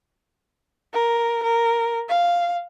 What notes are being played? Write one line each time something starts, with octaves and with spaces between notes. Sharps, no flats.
A#4
A#4
F5